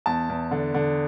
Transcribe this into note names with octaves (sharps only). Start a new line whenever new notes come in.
E2 A5
E2
D3
D3